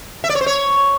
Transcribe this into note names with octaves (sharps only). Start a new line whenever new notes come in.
E5
D5
C#5
C5
C#5